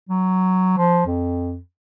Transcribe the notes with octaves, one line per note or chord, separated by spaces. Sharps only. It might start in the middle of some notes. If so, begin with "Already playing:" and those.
F#3
F3
F2